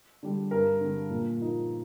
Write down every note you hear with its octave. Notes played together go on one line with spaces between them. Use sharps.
D3 G3
G2 A#4
D3 G3
A#2
F3 A#3 D#4